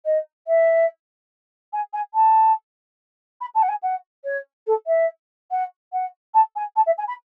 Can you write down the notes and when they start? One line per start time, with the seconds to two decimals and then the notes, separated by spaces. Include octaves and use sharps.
0.05 D#5
0.47 E5
1.73 G#5
1.93 G#5
2.14 A5
3.41 B5
3.55 A5
3.62 F#5
3.69 G#5
3.82 F#5
4.24 C#5
4.67 A4
4.87 E5
5.51 F#5
5.92 F#5
6.34 A5
6.56 G#5
6.76 A5
6.86 E5
6.98 G#5
7.07 B5